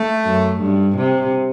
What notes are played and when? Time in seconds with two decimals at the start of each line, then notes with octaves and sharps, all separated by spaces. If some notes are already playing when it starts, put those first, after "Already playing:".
Already playing: A3
0.25 F#2
0.61 G2
0.97 C3